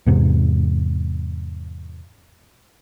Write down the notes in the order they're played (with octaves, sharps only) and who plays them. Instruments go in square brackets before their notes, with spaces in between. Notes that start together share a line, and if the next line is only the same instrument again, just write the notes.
[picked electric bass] E2 G#2 C3